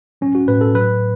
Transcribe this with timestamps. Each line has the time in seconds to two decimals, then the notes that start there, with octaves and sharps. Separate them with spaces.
0.21 F#3 C#4
0.35 F#4
0.48 A2 B4
0.61 A4
0.75 F#3 B4